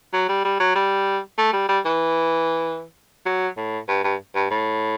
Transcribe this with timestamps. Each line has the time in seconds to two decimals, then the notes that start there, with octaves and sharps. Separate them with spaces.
0.13 F#3
0.29 G3
0.45 G3
0.60 F#3
0.75 G3
1.38 A3
1.53 G3
1.69 G3
1.85 E3
3.26 F#3
3.57 A2
3.89 G2
4.04 G2
4.35 G2
4.51 A2